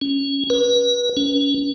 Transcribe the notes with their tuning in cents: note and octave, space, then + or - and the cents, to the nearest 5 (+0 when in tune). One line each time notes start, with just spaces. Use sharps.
C#4 +0
B4 -30
C#4 +25